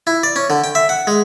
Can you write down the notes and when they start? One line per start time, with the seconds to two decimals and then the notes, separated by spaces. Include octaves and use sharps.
0.07 E4
0.23 D5
0.36 C#4
0.50 D3
0.64 G5
0.75 E5
0.89 F#5
1.07 G#3